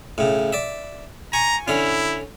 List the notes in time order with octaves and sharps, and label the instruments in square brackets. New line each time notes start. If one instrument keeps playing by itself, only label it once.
[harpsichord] A2 C#3
D5 E5
[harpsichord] G#5 C#6 [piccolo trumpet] A#5
[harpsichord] D3 C#4 [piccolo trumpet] E4